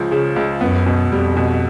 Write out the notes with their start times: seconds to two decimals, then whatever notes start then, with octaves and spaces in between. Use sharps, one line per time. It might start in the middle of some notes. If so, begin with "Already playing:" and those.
Already playing: C#2 F3
0.11 C#3
0.36 C#2
0.61 F#2 B3
0.86 B2
1.11 F2 G3
1.37 B2